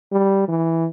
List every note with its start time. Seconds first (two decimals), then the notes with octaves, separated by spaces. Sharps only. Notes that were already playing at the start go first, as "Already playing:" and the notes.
0.12 G3
0.48 E3